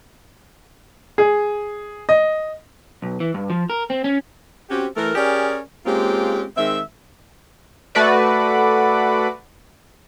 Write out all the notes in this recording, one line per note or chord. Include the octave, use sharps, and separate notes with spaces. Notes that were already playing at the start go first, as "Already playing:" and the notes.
G#4
D#5
B1
E3
G2
F3
A#4
C4
C#4
C4 C#4 F#4 G4
E3 A3 A4 A#4
C#4 G4 G#4 A#4 D5
G#3 A#3 C4 C#4 F4 G4
D#3 G#3 C4 E5
A3 F#4 B4 D5